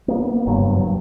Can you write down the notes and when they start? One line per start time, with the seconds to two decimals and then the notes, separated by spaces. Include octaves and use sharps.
0.08 A#3 B3
0.46 F#1 G2 F#3
0.76 G2 F#3